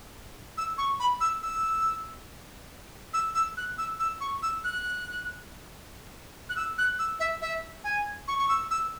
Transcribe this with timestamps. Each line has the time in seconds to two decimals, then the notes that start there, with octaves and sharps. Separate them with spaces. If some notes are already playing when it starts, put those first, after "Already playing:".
0.58 E6
0.78 C#6
1.00 B5
1.21 E6
1.43 E6
3.14 E6
3.35 E6
3.57 F#6
3.78 E6
4.00 E6
4.21 C#6
4.43 E6
4.64 F#6
6.49 F#6
6.56 E6
6.78 F#6
6.99 E6
7.20 E5
7.42 E5
7.84 G#5
8.28 C#6
8.39 C#6
8.49 E6
8.71 E6